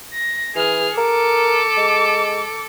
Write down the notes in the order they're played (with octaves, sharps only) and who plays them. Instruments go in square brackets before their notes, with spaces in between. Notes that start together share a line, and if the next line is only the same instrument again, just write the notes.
[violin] A#6
[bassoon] E3 [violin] G#4 F6
[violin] A4 D6 [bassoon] A#4
[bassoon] G#3